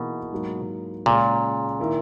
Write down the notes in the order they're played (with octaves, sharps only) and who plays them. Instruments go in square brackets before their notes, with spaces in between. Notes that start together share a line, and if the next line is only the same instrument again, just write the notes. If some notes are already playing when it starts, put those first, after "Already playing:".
Already playing: [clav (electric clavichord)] B2 [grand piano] E3 A#3 D#4 G#4
[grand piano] G#2 F#3 A#3
[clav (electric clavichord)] A#2 [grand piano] C#3 G#3 C#4 G#4
[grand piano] D#3 A#3 E4 A#4